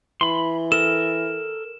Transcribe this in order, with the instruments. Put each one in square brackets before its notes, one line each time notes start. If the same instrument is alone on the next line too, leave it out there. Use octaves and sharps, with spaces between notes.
[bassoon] E3 [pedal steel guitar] B5 C6
[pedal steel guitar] A4 A#4 [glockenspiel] E7